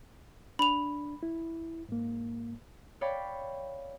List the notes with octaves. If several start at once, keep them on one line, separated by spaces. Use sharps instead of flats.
D4 B5 F7
E4
G#2 A#3
C#5 D5 F5 G5 B5 D6